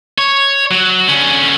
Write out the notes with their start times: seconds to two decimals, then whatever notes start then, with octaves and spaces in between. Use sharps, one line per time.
0.18 C#5
0.71 F#3
1.08 D3 C#4